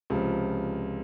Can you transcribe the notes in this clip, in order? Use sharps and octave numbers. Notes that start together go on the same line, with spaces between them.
C#2 C3 F3